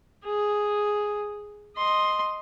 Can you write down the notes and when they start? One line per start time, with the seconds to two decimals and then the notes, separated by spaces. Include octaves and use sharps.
0.25 G#4
1.77 D#5 C6